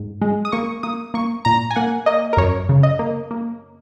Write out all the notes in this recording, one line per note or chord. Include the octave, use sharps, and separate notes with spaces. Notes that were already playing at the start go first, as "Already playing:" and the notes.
Already playing: G#2
G#3
D#6
A#3 C#6
A#3 D#6
A#3 C#6
A#2 A#5
G#5
A#3 F#5
A#3 D#5
A#4
F#2 C#5
C#3
D#5
A#3
A#3